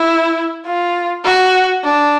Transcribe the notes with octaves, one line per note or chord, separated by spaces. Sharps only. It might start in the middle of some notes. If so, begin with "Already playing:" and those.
Already playing: E4
F4
F#4
D4